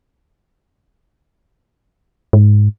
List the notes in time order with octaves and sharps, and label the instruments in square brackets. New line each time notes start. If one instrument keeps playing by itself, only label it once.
[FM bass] G#2